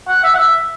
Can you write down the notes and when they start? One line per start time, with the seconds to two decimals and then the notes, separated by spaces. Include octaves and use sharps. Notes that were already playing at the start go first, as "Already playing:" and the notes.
0.08 F#5
0.24 E5
0.35 F#5
0.39 E5